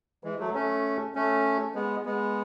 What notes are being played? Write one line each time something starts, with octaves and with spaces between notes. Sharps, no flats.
E3 G#3
F#3 A3
A3 C#4
A3 C#4
G#3 B3
G#3 B3